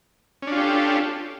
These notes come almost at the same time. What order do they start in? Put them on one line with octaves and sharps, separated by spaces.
C#4 D4 F4 G4 A4